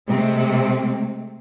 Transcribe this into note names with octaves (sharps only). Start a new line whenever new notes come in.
C3 G#3 A3 C4